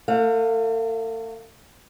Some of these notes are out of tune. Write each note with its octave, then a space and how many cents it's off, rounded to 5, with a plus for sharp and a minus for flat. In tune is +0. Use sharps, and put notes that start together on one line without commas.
A3 +45 F5 +25